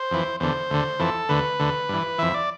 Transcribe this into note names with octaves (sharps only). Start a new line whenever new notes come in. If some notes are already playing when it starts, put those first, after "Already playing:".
Already playing: C5
F2 E3
E2 D3 C5
D2 D3
F2 E3 A4
D2 D3 B4
D2 D3
G2 E3
F2 E3 E5
D5